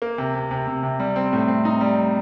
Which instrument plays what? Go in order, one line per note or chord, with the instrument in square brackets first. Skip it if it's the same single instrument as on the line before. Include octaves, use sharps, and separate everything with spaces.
[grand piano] A#3
C3
C3
C3
C3
C3
G3
C4
A2
C4
D#4
G3